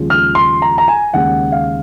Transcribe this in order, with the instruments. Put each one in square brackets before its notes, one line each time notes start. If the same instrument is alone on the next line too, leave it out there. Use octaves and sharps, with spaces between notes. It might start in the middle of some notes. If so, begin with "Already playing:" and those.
Already playing: [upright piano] D#2 C#3 F3 G#3
F6
C6
A#5
A#5
G#5
D#2 C#3 G#3 F#5
F5